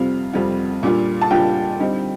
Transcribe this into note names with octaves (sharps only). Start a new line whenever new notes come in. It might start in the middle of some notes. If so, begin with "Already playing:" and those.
Already playing: F2 C3 G3 C4 F4 F5
F2 C3 G3 C4 F4
A#2 G3 D4 F4
A5
A#2 G3 D4 F4 G5
D3 G3 C4 D#4